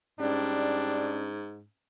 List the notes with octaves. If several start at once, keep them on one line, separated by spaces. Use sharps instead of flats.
G#2 G3 C#4 D4